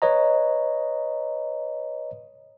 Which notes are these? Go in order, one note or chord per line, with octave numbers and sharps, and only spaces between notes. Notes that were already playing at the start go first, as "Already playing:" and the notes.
B4 C#5 D#5 A#5